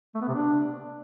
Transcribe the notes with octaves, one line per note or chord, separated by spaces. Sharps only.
A3
B3
C3
D4